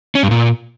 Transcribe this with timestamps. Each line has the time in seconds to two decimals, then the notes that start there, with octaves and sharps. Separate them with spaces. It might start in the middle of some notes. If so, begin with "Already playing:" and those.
0.15 C#4
0.23 G2
0.31 A#2